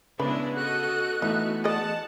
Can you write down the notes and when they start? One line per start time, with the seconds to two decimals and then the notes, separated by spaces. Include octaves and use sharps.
0.20 C#3 G#3 B3 D4 E4 B4
0.56 F#4 A4 D#5 F#6
1.22 E3 A3 B3 D#4 F#4
1.64 G#4 D5 D#5 F#5 A5